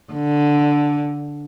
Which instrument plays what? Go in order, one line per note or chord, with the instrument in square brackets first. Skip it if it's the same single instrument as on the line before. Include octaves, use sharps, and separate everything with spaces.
[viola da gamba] D3